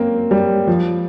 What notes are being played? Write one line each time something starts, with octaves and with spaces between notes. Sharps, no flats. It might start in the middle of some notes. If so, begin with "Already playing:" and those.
Already playing: A#3 C4 C#4
G3
F3